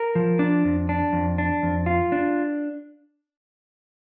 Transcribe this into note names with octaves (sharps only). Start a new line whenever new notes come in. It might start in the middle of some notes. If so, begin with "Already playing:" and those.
Already playing: A#4
F3
D4
F2
D4
F2
D4
F2
F4
D4